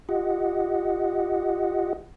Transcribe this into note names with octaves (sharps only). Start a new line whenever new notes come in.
F4 G4 D#5 F#5